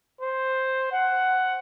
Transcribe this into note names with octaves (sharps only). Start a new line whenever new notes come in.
C5
F#5